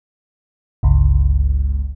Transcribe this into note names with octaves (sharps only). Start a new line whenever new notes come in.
G1 C#2